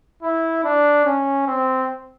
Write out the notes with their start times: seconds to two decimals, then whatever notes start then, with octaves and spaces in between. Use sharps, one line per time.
0.23 E4
0.64 D4
1.05 C#4
1.47 C4